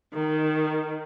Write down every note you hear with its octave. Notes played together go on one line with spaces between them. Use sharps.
D#3